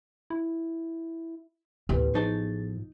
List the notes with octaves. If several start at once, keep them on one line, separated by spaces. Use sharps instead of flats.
E4
A1 D2 B3 G4 B4
F3 D#4 G#4 A5 A6